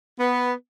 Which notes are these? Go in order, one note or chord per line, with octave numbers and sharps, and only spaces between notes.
B3